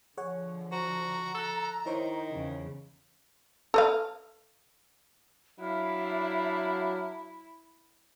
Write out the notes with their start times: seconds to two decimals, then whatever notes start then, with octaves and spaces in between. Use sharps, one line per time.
0.17 D3 F3 G#4 C#5 F#5
0.72 F#4 C5 A#5
1.35 A4 E6 F#6
1.86 D#3 D#4 E4 C5 C#5
2.31 E2 C#3
3.74 A4 D#5 F5
5.60 F#3 D4 E4 E5 F5